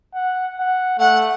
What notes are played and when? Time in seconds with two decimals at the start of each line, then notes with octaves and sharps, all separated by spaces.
0.15 F#5
0.59 F#5
0.99 A3 F#5